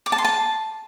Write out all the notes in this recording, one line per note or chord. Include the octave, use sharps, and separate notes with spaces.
D6
A5
C6
A5